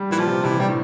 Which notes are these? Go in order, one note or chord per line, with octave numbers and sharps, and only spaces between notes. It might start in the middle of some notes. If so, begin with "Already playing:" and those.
Already playing: G3
A#2 E3
F3
C3
C3 E3
G3
A2